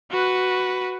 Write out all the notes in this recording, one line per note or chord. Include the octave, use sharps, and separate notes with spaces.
F#4 B4